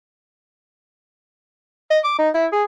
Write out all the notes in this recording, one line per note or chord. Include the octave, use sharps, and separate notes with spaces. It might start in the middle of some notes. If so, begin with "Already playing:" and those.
D#5
D6
D#4
E4
G#4